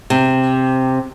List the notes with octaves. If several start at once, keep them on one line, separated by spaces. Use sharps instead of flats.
C3